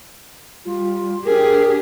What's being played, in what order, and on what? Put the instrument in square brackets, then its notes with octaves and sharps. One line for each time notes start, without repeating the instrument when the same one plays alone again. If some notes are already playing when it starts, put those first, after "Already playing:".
[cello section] G3 [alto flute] F4
[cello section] D4 G4 G#4 [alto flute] A#4